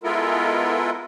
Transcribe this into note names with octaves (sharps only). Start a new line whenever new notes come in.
G#3 B3 E4 F4 A4 A#4